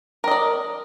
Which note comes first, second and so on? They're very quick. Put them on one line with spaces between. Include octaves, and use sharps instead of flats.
A#4 D#5 D5